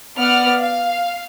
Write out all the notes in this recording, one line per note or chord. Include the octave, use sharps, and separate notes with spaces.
B3 D5 F#5 F6
F5